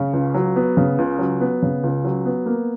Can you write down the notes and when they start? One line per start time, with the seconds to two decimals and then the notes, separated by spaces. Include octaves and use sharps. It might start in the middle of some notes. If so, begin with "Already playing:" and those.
Already playing: C#3
0.13 C#2
0.34 F#3
0.56 B3
0.77 C#3
0.98 C#2
1.19 F#3
1.41 B3
1.62 C#3
1.83 C#2
2.04 F#3
2.25 B3
2.46 A#3